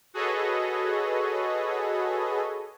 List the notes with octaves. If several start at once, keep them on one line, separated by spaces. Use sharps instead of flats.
F#4 G#4 A4 B4 C#5 D#5